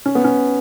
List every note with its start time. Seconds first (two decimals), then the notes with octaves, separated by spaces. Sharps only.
0.06 C#4
0.15 B3
0.24 C#4